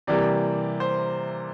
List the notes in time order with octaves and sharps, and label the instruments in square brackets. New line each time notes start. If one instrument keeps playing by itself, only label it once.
[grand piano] C3 E3 G3 A#3 D5
C5